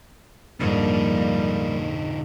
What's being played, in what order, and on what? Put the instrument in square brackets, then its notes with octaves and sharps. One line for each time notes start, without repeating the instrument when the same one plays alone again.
[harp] A#1 F2 G#2 [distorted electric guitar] D3 D#4 [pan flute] G3 [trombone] A#3